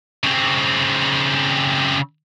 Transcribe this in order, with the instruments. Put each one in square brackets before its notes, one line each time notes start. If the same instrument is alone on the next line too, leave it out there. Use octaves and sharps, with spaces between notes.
[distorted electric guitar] C#3 C4